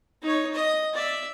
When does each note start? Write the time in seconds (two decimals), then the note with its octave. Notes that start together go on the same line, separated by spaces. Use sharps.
0.22 D#4 C#5
0.53 D#5
0.94 D5 E5